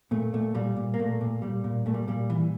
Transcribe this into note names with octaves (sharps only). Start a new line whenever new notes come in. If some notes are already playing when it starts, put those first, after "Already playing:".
A#2 A3
A#2 A3
A#2 G3
A#2
A#3
A#2 A3
A#2
A#2 G3
A#2
A#2 A3
G3
A#2 G3
E3